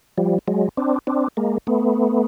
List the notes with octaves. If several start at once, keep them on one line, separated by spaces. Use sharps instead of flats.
F3 G3
F#3 G#3
C4 D4
C4 D4
G#3 A#3
A3 B3